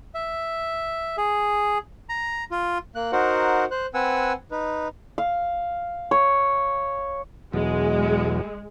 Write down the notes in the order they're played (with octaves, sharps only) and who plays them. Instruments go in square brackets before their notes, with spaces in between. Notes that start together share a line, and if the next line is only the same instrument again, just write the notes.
[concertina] E5
G#4
A#5
F4
[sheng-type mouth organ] A#3 F#6
D#4 F#4 A#4 C5 F#5
C5 F#6
C4 B4 F#5 G#5 E6
D#4 B4
[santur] F5
C#5
[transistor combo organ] E2 B2 F#3 [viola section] G#3